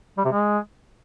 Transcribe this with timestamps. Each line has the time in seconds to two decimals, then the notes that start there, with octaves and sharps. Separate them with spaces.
0.18 G3
0.25 C3
0.32 G#3